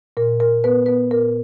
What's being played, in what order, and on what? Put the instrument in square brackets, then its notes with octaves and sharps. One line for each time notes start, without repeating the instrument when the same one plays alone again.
[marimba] A#2 A#4
A#2 A#4
B3 B4
B3 B4
A#2 A#4